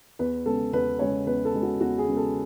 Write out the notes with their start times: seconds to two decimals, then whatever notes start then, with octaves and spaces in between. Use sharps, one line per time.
0.19 E2 B4
0.46 C#3 G#3 B3 A4
0.73 E2 B4
0.99 C#3 G#3 B3 C#5
1.26 E2 B4
1.45 A4
1.54 C#3 G#3 B3
1.63 F#4
1.80 E2 F#4
1.98 G#4
2.08 C#3 G#3 B3
2.17 A4